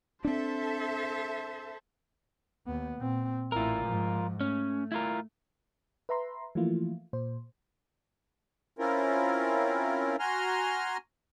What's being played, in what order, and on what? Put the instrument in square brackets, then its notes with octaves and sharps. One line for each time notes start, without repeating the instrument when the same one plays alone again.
[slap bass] C4 D4 [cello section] A4 E5 [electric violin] C5 A5
[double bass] D#2 B3
A#2 C4
[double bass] A1 E4 [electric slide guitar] F4 A#4
[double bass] G#2 F3
[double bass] A3 [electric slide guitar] C#4
[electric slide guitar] E4 F4 A#4
[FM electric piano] B4 E5 A#5 C6
E3 F3 A3 A#3 E4 F4
A#2 C5
[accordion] C4 C#4 E4 F4 A#4
F#4 G#5 A#5 C6 F6